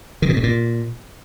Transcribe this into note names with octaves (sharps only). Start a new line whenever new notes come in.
D#3
B2
A2
A#2